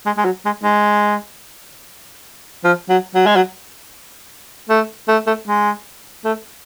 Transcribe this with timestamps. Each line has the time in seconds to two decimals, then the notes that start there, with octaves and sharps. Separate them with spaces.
0.06 G#3
0.17 G#3
0.25 F#3
0.45 G#3
0.63 G#3
2.64 F3
2.89 F#3
3.15 F#3
3.26 G#3
3.36 F#3
4.69 A3
5.08 A3
5.27 A3
5.47 G#3
6.24 A3